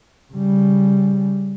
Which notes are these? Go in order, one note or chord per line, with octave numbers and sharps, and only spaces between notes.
C#3 G3